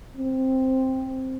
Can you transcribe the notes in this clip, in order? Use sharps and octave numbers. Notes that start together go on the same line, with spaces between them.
C4